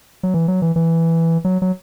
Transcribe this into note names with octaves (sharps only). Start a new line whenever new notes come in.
F#3
E3
F#3
E3
E3
F#3
F#3